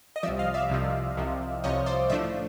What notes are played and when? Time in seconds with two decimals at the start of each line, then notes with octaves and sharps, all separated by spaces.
0.16 D#5
0.23 C2 C3 F3 D5 E5
0.39 D#5 F5
0.54 D5 E5
0.70 C2 C3 F3
1.17 C2 C3 F3
1.64 C2 C3 F3 C#5 D#5
1.86 C5 D5
2.10 A2 F3 A3 D4 D5 E5